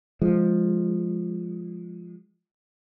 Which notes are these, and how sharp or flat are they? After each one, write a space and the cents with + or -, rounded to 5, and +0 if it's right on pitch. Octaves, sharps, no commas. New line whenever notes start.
F3 +0 G#3 +0